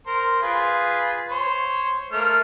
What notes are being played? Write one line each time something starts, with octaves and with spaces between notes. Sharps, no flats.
A#4 C5
F4 G#4 B4
C5 C#5
A3 A#3 F6